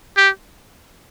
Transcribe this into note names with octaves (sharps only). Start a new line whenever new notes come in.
G4